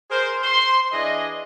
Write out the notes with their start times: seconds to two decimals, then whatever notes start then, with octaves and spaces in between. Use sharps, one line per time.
0.10 G#4 A#4 C5
0.43 C5 C6
0.92 E3 D4 G#4 D#5